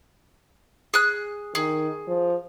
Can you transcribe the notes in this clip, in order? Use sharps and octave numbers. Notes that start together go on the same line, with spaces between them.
G#4 F#6
D#3 G#4
F3